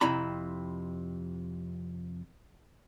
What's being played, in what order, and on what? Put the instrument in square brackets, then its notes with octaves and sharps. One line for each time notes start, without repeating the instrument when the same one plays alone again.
[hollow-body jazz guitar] F2 C3 E4 A#5 B5